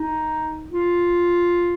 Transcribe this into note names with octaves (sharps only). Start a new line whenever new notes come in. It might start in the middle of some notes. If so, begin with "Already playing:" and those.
Already playing: D#4
F4